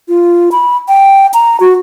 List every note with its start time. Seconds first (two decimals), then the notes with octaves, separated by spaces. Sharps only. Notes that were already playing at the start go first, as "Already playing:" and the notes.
0.08 F4
0.52 B5
0.88 G5
1.34 A#5
1.60 F#4